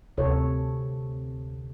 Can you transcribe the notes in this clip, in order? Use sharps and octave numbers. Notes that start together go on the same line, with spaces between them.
D2 C3 A4 C#5